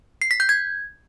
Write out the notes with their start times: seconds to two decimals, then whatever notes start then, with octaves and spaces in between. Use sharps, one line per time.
0.22 C7
0.31 B6
0.40 G6
0.49 G#6